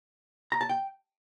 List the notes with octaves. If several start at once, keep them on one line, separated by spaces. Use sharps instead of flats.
A#5
A5
G5